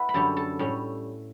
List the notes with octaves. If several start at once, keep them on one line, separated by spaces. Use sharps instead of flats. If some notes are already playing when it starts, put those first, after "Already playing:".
Already playing: B3 E4 B4
B5
F#2 D3 G3 C#4 A4 A5
A4 A5
A2 G3 C#4